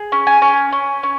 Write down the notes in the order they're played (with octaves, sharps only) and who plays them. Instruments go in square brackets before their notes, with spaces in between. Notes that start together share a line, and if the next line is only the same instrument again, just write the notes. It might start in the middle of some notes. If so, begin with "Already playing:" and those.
Already playing: [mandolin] G#4
C#4
G#5
C#4
C#4
C#4